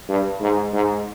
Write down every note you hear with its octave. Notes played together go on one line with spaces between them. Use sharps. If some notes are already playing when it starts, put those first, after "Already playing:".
G2
G#2
G#2